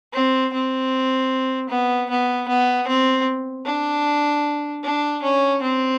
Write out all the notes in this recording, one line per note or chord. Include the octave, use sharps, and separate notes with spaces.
C4
C4
B3
B3
B3
C4
D4
D4
C#4
C4